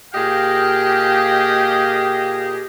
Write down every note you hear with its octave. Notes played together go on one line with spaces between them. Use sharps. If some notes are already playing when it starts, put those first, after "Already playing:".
A#2 G4 G#4 D#5 F5 G5